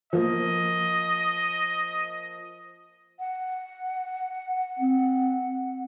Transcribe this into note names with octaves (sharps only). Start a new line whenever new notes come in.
F3 A#3 D#5
F#5
C4